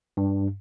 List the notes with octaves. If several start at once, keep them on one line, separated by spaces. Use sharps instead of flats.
G2